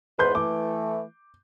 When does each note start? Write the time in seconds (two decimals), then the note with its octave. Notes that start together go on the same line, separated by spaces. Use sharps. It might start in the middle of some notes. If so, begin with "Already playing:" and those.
0.19 E2 G#2 B4 C6 G6
0.35 E3 A3 D6